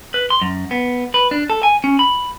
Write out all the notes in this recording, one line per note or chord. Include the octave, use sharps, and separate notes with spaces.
B4
C6
F#2
B3
B4
D4
A4
G#5
C#4
B5